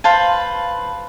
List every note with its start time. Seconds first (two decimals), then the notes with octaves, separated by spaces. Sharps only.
0.04 B4 C5 F5 A5